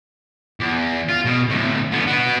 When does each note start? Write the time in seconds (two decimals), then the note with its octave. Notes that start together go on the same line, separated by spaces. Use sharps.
0.60 E2
1.08 F4
1.25 B2
1.48 D2 A2
1.92 D3 B3
2.07 B3 F#4